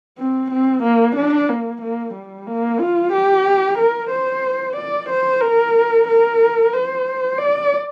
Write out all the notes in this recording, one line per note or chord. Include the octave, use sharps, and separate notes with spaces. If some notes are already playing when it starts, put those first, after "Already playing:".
C4
C4
A#3
D4
A#3
A#3
G3
A#3
F4
G4
A#4
C5
D5
C5
A#4
A#4
C5
D5